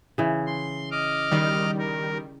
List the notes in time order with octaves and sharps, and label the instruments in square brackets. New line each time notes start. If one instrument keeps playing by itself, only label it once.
[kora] C#3 E3
[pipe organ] C6
D#5 D6 F6
[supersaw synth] D#3 G3
[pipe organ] A#4